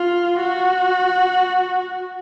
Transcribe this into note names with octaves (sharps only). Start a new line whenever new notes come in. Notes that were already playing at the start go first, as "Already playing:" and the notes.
Already playing: F4
F#4